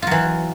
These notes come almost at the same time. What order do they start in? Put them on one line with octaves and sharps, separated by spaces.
F4 F#3 E3